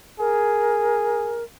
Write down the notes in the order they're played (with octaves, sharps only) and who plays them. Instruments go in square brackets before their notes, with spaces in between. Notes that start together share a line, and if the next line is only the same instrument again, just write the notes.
[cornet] G#4 [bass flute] A#4